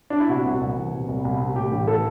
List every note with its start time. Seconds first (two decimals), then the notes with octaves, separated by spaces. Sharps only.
0.10 D4
0.20 E4
0.29 C3 F#4
0.45 C2
0.61 C2
0.76 E3
0.93 C3
1.08 C2
1.25 C2
1.40 C3
1.56 A2 G4
1.72 A1
1.87 E3 A4